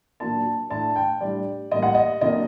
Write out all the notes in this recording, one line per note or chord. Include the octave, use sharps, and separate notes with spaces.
A#2 F#3 A#3 D4 A5
A2 A3 D4 A5
G5
A2 G3 D4 D5
A2 G3 A#3 D#5
F#5
D#5
C3 F#3 A#3 D4 D#5